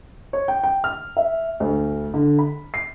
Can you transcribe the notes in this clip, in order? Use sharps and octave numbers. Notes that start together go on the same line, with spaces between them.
C#5
G5
G5
F6
E5
D2
D3
B5
C7